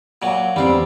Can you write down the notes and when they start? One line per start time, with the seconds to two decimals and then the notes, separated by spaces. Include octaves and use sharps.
0.22 A#2 F#3
0.56 E2 G3 C4 D4